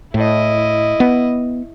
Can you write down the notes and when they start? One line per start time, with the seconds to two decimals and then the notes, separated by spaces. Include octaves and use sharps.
0.14 A2 E4 D#5
1.00 B3